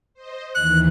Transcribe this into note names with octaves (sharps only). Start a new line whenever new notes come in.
C5 D#5
D#2 E3 F#6